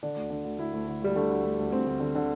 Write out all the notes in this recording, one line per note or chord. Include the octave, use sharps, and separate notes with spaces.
D3 D4
D2
D3
D2
D2 E4
D2
D3
D2 G3
D3 A3
D2
D2
D2
D2 C4
D2
D3
D3